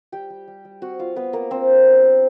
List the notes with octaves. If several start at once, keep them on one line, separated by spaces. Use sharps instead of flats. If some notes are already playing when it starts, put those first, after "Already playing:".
G3 G4 G5
G3
G3
G3
C4 F#4 F#5
G3 F4 F5
B3 F4 B4
A#3 C4 A#4
C4 D4 C5
D4
B3
G3